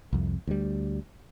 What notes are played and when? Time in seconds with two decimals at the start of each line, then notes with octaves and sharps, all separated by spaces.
0.13 C2 F2
0.47 D2 G3